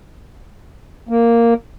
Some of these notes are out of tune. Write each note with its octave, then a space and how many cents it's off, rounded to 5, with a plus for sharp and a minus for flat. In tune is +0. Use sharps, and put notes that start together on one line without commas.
A#3 -5